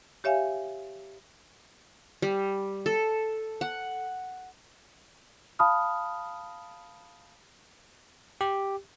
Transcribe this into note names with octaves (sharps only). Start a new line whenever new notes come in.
G4 C#5 E5 F5 G#5
G3
A4
F#5
F5 A5 B5 D#6 F6
G4